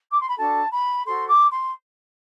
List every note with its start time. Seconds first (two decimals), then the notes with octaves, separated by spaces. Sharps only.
0.12 D6
0.20 C6
0.29 B5
0.37 D4 F#4 A4 A5
0.71 B5
1.05 F#4 A4 C5 C6
1.28 D6
1.51 C6